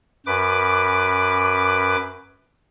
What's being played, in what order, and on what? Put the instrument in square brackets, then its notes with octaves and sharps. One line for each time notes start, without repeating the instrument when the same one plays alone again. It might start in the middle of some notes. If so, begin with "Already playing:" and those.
[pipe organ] F#2 B4 D6